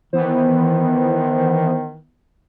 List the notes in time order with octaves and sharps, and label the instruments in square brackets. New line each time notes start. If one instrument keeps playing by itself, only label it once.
[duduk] D#3 [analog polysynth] E3 B3 [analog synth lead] C5